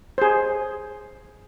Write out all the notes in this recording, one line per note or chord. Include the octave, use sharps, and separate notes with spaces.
G#4 C5